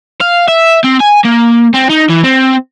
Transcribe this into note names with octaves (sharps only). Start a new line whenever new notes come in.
F5
E5
C4
G#5
A#3
C4
D#4
E3
C4